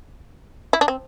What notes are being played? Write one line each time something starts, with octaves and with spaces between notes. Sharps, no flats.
E4
D4
C4